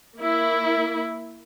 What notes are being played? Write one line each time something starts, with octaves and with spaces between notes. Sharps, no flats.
A#3 E4